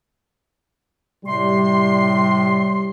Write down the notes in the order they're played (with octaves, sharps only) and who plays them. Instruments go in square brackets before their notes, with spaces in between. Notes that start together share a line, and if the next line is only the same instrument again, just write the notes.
[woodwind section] A2 C3 C6 [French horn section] G3